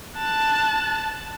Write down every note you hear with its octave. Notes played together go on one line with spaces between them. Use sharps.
A5 F#6